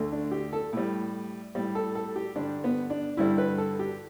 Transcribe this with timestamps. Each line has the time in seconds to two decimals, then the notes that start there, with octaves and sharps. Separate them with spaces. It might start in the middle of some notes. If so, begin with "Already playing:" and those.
Already playing: D2 D3 A3
0.12 D4
0.31 G4
0.53 A4
0.73 A2 G3
1.55 A2 G3
1.75 A4
1.95 A4
2.16 G4
2.36 G2 D3 G3 D4
2.64 B3
2.90 D4
3.17 G2 D3 G3 E4
3.38 B4
3.58 A4
3.79 G4